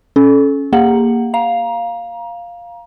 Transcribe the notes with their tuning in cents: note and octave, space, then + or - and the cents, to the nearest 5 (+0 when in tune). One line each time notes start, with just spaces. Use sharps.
C#4 +0 A4 -25
A#3 +0 G4 +45 F#5 +5
F5 +0 A#5 +25